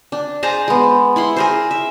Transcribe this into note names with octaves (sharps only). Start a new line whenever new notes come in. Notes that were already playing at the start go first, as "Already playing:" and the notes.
D4
G#4 C5 A5 A#5
G#3 B3
E4 F#5 C6
G#4 A#4 C5
E5